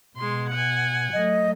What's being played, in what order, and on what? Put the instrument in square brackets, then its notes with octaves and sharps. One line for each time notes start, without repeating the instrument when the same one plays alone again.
[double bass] B2 [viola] G#3 C6
[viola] F#5 G#5
[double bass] F#3 A3 [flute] D#5